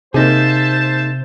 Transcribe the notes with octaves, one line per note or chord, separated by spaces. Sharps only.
C3 A#3 D#4 G#4 C5 E5 A5